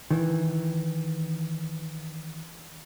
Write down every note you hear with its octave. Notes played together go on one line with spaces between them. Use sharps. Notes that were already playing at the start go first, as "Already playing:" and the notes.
D#3 E3